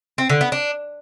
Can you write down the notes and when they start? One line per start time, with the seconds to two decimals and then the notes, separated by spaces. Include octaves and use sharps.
0.18 C4
0.29 D3
0.41 B3
0.52 D4